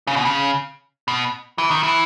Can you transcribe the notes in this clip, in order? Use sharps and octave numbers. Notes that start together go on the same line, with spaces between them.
C#3
B2
C#3
B2
E3
D#3
E3